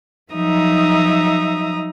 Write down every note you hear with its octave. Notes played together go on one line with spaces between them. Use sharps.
F3 F#3 D#4 E5 A#5 D#6